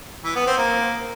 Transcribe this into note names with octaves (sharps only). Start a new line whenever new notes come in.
E3
B3
C4
A#3